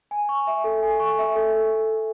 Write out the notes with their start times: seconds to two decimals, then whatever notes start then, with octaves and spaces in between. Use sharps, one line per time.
0.11 G#5
0.29 C#6
0.47 E5
0.64 A4
0.83 G#5
1.00 C#6
1.19 E5
1.36 A4